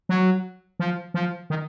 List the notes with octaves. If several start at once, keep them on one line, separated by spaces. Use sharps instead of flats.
F#3
F3
F3
D#3